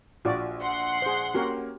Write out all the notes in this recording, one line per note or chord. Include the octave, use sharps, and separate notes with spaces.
A#1 F4 F#4 D5
F#5 C6
G#4 C5
A#3 C#4 F#4 G4 A#4